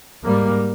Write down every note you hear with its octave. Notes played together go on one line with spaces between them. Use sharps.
G#2 G3 A#3